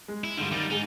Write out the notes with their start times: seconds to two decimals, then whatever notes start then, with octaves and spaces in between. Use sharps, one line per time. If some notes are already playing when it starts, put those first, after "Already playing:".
0.08 G#3
0.24 E4
0.37 G2 D3 G3 G#3
0.51 D#3 G3 D#4 A6
0.70 G#2 D#4 G#4